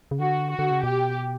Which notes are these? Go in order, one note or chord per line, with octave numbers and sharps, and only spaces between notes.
C#3
D3 F#4
F#4
D3
C#3
B2 G4